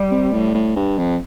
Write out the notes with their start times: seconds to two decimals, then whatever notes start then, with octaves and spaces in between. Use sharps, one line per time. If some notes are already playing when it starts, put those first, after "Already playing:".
Already playing: G3
0.11 C3
0.33 A2
0.54 A2
0.76 G2
0.97 F2